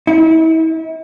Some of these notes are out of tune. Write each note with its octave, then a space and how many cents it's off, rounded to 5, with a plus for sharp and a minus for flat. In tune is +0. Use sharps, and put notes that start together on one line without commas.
E4 -40